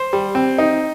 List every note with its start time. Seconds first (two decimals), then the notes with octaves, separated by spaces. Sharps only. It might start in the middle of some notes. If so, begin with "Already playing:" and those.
Already playing: C5
0.13 G3
0.35 C4
0.58 D#4